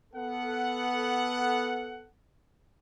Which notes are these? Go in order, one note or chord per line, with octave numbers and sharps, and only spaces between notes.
B3 A4 F#5